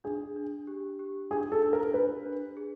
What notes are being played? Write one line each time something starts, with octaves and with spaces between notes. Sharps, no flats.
D4 G#4
D4
G4
G4
D4 G#4
A4
D4
A#4
D4 B4
D4
G#4